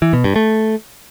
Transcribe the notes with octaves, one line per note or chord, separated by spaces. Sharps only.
E3
B2
G2
A3